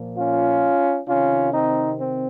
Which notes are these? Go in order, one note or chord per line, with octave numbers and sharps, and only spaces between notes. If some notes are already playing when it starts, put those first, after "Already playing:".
Already playing: A#2 F3
C#4 F4
C3 D#3 C#4 F4
C4 D#4
C4